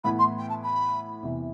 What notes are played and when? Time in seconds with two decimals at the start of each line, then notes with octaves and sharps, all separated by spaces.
0.04 A2 E3 B3 E4 B5
0.18 C6
0.38 G5
0.49 A5
0.63 B5
1.23 E2 C3 E3